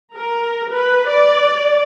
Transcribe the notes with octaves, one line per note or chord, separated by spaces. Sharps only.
A#4
B4
D5